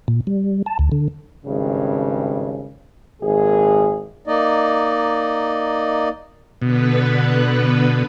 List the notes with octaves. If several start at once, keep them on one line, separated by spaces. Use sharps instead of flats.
A#2
G3
A5
D2
D3
G#1 G2 C#3
G#1 A#2 G#4
A#3 D#4 D5 D#5
B2 D3 B3 B4